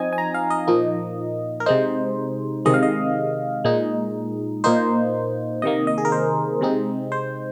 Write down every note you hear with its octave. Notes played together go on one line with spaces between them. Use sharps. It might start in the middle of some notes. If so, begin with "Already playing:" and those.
Already playing: F3 C4 D#4 D#5 G#5
G#5
A#5
F5
D#5
A#2 F3 A#3 D#4
A#4
C3 G#3 D#4 C5
C3 D#3 G#3 D#5
F5
D#5
A#2 G#3 D#4
A#2 A#3 D#4 C5
C3 D#3 A#3 D#5
D#5
G#4
A#4
C5
C3 G#3 C4 D#4
C5